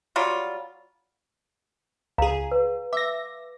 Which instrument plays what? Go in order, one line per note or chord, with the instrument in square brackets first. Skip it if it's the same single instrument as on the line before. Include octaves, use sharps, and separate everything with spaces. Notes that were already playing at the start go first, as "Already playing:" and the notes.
[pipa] F#3 G3 F4
[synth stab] C#2 G#4 [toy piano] F5 A#5
[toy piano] B4
[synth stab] E5 A#6 [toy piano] D6